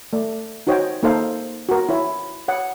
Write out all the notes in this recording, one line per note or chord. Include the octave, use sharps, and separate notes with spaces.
A3 D5
D#4 F#4 C5 C#5 D#5 G5
A#3 D#4 A4 C5 F5
F#4 A#4
E4 C#5
C#5 F#5